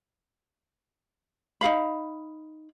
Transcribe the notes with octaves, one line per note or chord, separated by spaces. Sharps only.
D#4 G#4 F5 B5